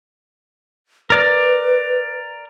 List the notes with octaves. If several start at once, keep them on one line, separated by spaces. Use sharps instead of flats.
A#4 B4 D5 F6